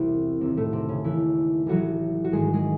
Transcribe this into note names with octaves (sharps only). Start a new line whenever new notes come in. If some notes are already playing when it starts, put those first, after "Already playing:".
Already playing: E1 C2 C3 E3 C4 E4 F#4
E1 D#2 C3 D#3 C4
A2 A3
C3 C4
C#3 C#4
D#2 D#3 E3 E4
A1 A2 E3 F#3 F#4
F#4
G#1 G#2 D#3 G#3 G#4
G#3 G#4